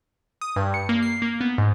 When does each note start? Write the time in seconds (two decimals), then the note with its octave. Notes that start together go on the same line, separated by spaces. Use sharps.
0.41 D#6
0.56 G2
0.74 C#7
0.89 A#3
1.02 C7
1.22 A#3
1.41 B3
1.58 G#2